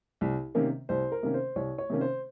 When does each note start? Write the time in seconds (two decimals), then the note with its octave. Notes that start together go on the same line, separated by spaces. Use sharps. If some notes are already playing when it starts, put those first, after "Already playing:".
0.21 C2
0.55 C3 D#3 A#3 C#4
0.89 C2 C5
1.12 A#4
1.23 C3 D#3 A#3 C#4
1.34 C5
1.56 C2 C#5
1.78 C#5
1.90 C3 D#3 A#3 C#4
2.01 C5